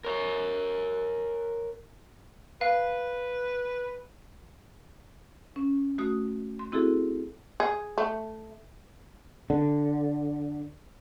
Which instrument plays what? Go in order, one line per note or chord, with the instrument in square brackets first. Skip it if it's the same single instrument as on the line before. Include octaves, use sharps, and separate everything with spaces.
[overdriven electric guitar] A#4 C#5
[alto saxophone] B4 [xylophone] F5
[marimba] C#4
A3 F#4 D#6
C6
C4 E4 F#4 G#4 A4
[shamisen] G#4
A3
[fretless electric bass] D3